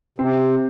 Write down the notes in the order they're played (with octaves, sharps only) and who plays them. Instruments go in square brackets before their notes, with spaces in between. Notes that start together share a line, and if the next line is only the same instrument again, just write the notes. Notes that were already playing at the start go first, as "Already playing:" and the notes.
[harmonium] C3 [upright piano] C4